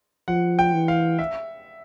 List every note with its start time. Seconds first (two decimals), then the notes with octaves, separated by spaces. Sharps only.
0.28 F3 F#5
0.59 G5
0.73 E3
0.88 F5
1.19 E5